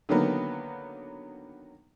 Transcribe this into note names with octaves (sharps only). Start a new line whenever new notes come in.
D3 D#3 F#3 A#3 B3